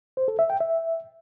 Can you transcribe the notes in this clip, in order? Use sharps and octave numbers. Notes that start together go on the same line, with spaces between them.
C5
A4
E5
G5
E5